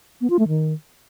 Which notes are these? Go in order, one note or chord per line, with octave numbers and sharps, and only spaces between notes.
B3
F4
A3
D#3